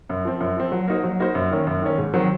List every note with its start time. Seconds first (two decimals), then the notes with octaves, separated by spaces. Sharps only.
0.09 F#2
0.25 F3 C4
0.40 F#2
0.56 F3 C4
0.72 F#3
0.88 A#3 D#4 F#4 C5
1.04 F#3
1.20 A#3 D#4 F#4 C5
1.35 F#2
1.51 D#3 A#3 C#4
1.67 F#2
1.82 D#3 A#3 C#4
1.98 G#2
2.14 D#3 F#3 C4